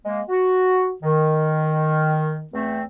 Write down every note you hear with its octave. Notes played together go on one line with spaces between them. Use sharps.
G#3 A#3
F#4
D#3
E2 A3 C4